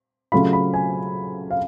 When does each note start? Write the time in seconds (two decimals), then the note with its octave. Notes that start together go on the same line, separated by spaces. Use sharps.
0.32 C#3 F#3 A3 F4 B5
0.53 B5
0.74 G#5
1.51 F5